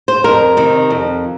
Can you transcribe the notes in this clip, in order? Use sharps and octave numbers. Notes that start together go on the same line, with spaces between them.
C5
F2 A#4
C3 D#3
F2